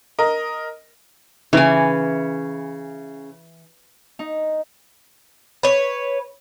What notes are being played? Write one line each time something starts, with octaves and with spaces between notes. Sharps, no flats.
A#4 D#5
C#3 E3 G#5
D#4
B4 C#5